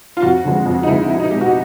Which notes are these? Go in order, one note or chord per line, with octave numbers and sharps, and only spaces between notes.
F4
F2 F#4
D3 F3 G#3
F2
D#4
D3 F3 G#3 E4
B1 E4
D#4
B2 G#3 G4
F#4